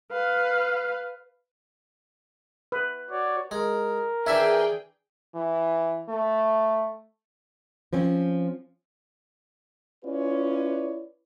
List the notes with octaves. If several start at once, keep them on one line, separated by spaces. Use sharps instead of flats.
B4 F5
B4
F#4 C#5 D5
G#3 A#4
E3 D4 E4 G#4 E5 G5
E3
A3
F3 C4 C#4
C#4 E4 F4 B4 C#5 D5